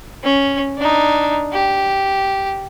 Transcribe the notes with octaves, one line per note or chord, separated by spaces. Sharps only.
C#4
D4 D#4
G4